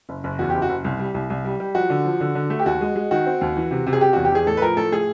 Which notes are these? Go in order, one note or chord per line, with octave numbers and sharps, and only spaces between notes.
F#1
F#1
E2 F#4
F#1 G4
F#4
F#1
C2
G3
C2
C2
G3
G3
F3 F#4
D3
F3
D3
D3
A3
G4
D#2 F#4
G#3
G#3
D#3 F#4
C4
D#2
E3
C3
C3
G#4
C3 G4
E2 F#4
G4
E2 G#4
A2 A4
B4
F3 A#4
A2 A4
A2 G#4